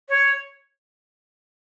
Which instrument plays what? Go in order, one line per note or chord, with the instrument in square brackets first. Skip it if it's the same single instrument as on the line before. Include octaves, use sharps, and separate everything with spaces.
[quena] C#5